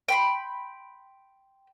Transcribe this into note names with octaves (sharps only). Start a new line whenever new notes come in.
G5 B5 C6